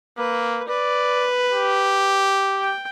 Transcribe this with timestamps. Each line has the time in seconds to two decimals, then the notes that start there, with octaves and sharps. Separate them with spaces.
0.18 A#3 B4
0.68 B4 D5
1.53 G4
2.58 G5